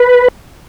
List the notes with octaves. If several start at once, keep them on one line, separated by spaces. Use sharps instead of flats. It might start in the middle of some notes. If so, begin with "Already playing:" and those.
Already playing: B4